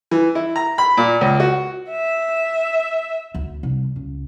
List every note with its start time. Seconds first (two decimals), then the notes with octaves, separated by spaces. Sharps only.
0.11 E3
0.35 E4
0.56 A#5
0.78 B5
0.97 A#2
1.21 C#2
1.40 F#4
1.91 E5
3.35 D2
3.63 C2
3.96 C#2